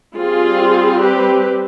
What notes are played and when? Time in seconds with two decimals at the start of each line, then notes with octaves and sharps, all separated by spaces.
0.15 G3 C4 F4 G#4
1.00 G4 B4